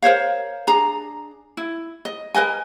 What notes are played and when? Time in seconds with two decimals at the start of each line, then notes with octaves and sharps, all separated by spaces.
0.02 A#4 C5 C#5 F5
0.67 D4 G#4 A#5
1.57 E4
2.05 D#5
2.35 A#4 B4 D#5 G#5